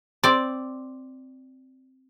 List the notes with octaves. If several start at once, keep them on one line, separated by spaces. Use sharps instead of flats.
C4 D5